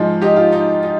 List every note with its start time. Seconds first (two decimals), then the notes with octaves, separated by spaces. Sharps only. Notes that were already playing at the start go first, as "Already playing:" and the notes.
Already playing: G#2 F3 G#3
0.21 D#4 G4
0.36 F4
0.52 D#4
0.83 D#4